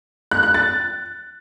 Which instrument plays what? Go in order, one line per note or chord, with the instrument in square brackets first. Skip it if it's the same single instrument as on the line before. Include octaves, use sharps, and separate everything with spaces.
[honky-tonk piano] F#6
F#6
A6